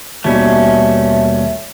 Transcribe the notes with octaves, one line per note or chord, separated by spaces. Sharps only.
D#2 B2 G3 A3 C#4